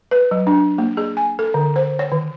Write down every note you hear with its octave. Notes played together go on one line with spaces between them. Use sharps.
B4
F#3
D4
A#3
G#4
G#5
A4
D3
C5
C#5
D#3